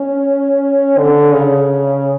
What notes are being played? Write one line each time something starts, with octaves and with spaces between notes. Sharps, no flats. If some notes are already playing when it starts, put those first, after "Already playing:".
Already playing: C#4
D3
C#3